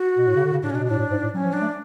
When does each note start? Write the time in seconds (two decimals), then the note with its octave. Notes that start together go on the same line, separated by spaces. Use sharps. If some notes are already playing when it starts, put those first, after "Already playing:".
Already playing: F#4
0.18 B2
0.27 A2
0.36 C#3
0.45 D3
0.53 C#3
0.63 A2 D4
0.70 B2 C#4
0.75 D4
0.80 B2
0.86 A2 D4
0.99 A2
1.11 G#2
1.23 A2
1.34 F#3 C#4
1.44 F3
1.53 F#3 D4
1.61 A3